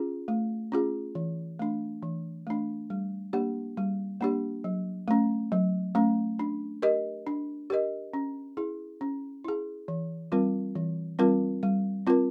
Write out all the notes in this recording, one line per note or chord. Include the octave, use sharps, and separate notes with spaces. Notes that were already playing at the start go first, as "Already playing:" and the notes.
Already playing: C#4 F4 G#4
A3
C#4 F4 G#4
E3
A3 D4
E3
A3 D4
G3
A#3 D4 G4
G3
A#3 D4 G4
F#3
A3 C#4
F#3
A3 C#4
D4
G4 A#4 D#5
D4
G4 A#4 D#5
C#4
E4 G#4
C#4
E4 G#4
E3
G3 C4 F4 A#4
E3
G3 C4 F4 A#4
G3
C4 F4 A#4